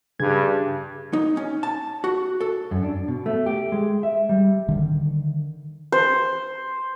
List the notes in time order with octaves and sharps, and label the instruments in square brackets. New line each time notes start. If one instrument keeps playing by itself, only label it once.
[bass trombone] G2 [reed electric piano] C#3 G#4 G#6
[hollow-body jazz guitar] D#4
C#4
A5
F#4
A4
F#2
D4
B2
A3
G4
G#3
E5
G3
[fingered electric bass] D3 D#3
[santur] C5